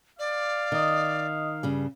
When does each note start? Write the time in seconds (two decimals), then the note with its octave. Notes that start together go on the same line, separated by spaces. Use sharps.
0.19 D5 F5
0.72 D#3 D#5 D#6
1.63 G2 C#3 G3